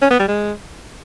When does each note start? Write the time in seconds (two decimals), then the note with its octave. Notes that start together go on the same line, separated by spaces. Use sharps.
0.02 C#4
0.10 B3
0.19 G3
0.28 G#3